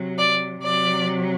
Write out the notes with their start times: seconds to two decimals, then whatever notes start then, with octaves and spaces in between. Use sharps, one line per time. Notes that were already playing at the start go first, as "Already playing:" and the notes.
Already playing: C3 F#3
0.17 D5
0.63 C3 F#3 D5